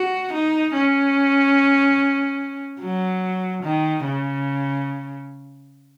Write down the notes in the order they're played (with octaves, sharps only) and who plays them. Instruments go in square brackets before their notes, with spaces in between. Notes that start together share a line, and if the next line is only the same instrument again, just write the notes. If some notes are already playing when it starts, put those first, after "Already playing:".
Already playing: [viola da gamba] F#4
D#4
C#4
F#3
D#3
C#3